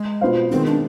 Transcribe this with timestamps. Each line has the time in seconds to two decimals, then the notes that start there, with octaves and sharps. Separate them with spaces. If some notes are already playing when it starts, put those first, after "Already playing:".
Already playing: G#3
0.21 B2 B3 F4 C5 F5
0.51 D#3 G#3 B3 C4
0.67 D4